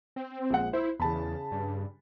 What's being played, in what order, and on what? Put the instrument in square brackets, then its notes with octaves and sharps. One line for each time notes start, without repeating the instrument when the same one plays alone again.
[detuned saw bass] C4
[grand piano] A#1 G#3 F#5
[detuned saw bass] E4 [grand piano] C5
[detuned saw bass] E2 [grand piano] C#3 A5 B5
[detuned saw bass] G2